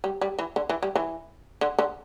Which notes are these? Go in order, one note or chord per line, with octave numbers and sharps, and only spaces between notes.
G3
G3
E3
D3
E3
G3
E3
D3
D3